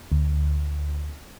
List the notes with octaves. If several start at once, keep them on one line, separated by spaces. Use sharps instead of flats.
D2